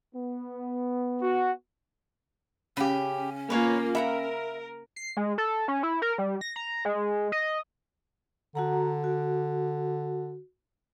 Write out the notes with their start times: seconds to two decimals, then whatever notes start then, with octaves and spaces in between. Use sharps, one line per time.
0.14 B3
1.22 F#4
2.77 C#3 C#4 G4 B5
3.50 A#3 F4 B4 C#5 G#5
3.95 A#3 A#4 E5 F#5 A#5 B5
4.96 C7
5.17 G#3
5.38 A4
5.68 C#4
5.83 E4
6.02 A#4
6.18 G3
6.41 A#6
6.56 A#5
6.85 G#3
7.32 D#5
8.55 D3 F#4 F#5 A#5
9.04 F#4